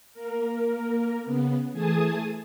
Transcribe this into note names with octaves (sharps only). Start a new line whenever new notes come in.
A#3 A#4
C#3 B3
E3 A3 G#4 G#5 A5 D#6